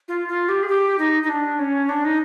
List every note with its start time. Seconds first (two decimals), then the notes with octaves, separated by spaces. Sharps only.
0.08 F4
0.28 F4
0.49 G4
0.63 G#4
0.68 G4
0.99 D#4
1.23 D#4
1.29 D4
1.59 C#4
1.89 D4
2.04 D#4